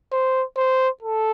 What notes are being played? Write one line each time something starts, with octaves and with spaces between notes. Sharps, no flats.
C5
C5
A4